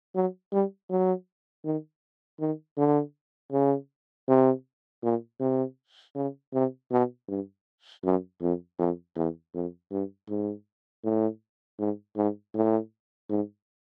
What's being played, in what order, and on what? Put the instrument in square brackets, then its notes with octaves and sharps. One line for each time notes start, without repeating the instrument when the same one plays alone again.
[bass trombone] F#3
G3
F#3
D#3
D#3
D3
C#3
C3
A#2
C3
C#3
C3
B2
G2
F#2
F2
F2
E2
F2
G2
G#2
A2
G#2
G#2
A2
G#2